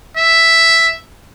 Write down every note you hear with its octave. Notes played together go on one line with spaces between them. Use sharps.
E5